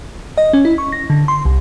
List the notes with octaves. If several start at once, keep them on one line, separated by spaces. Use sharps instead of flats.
D#5
C#4
E4
C#6
A#6
D3
C6
C2